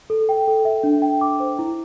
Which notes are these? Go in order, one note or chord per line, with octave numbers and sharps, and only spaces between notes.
A4
G5
A4
E5
D4
G5
D6
C5
E4